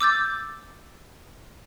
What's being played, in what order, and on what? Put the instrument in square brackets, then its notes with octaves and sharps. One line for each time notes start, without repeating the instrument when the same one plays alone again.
[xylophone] D6 E6 G6 A6